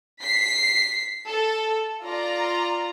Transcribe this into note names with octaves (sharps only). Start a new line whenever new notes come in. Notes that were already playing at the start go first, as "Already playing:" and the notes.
B6 C7
A4
F4 D5 A#5